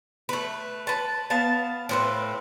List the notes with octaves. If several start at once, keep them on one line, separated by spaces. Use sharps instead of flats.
A3 B4
B4 A5
B3 F5 A5
A2 C4 B4